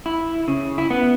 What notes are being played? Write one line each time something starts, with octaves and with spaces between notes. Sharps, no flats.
E4
C#3
E4
B3